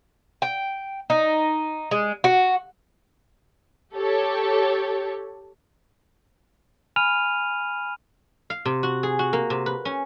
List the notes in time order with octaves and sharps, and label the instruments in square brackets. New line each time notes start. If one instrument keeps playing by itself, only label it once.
[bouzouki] G5
D#4
G#3
F#4
[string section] G4 A4 C#5
[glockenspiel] G#5 B5 F6 D#7 F7
[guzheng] F5
C3
F#4
G#4
F#4
A#3
C3
B4
C#4